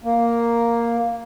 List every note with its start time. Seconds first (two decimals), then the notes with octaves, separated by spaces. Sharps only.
0.04 A#3